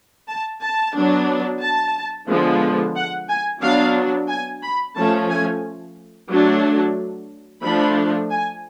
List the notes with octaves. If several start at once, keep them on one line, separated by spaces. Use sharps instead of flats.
A5
A5
F#3 B3 D4
A5
D3 F3 G#3 B3
F#5
G#5
F#3 B3 D4 F5
G#5
B5
F3 A3 C#4 A5
G#5
F#3 A3 D4
F3 A3 D4 B5
G#5